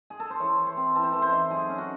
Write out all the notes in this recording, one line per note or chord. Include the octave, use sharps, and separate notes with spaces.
G#4
A4
C5
E3 C#5
E3
C5
C4
E3 A4
C5
E3 A4
C5
D#4
F#3 G#4
C#4
F#4